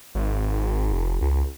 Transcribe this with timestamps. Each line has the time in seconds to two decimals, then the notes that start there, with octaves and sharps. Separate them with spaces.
0.15 G#1
0.92 F1
1.21 C#2